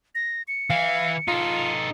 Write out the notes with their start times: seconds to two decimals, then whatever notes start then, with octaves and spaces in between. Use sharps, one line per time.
0.15 A#6
0.48 C#7
0.70 E3 F5
1.28 D#4 F4 A4